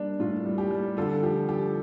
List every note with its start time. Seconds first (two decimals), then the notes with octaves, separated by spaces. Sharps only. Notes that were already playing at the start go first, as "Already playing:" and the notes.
Already playing: G3 A#3 D4
0.19 A2 F4
0.46 G3
0.58 G4
0.71 G3
0.97 D3 F4 A4
1.23 F3 G4
1.49 F3 G4